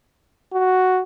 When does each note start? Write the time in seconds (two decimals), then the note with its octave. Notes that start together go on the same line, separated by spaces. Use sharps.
0.53 F#4